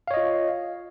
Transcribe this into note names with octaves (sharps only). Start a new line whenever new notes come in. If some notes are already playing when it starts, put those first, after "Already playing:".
F4 C#5 D#5 F5